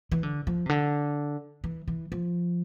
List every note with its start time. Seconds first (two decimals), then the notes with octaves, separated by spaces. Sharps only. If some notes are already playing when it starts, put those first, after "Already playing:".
0.12 E3
0.23 D3
0.47 F3
0.66 C3
0.69 D3
1.64 E3
1.88 E3
2.12 F3